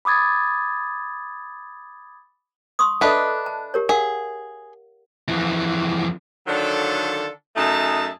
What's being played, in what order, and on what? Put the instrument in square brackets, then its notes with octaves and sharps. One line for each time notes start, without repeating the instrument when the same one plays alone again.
[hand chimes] B5 D6 D#6 G#6 A6
[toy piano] C6 C#6 D#6
[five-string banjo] D4 B4 [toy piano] A4 D#5 E5
[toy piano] A5
G4 A#4 C#5
[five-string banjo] G#4 [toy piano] A#4 F5 F#5
[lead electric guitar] F2 E3
[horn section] D3 D#3 F#3 D4 F4 A4
F#2 A3 D#4 G#4 E5 A5